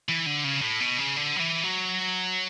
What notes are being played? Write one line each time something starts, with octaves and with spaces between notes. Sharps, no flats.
E3
D3
C#3
A2
B2
C#3
D3
F#3
E3
F#3